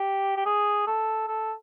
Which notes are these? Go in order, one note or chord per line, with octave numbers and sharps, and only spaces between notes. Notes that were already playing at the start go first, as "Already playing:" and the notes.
Already playing: G4
G4
G#4
A4
A4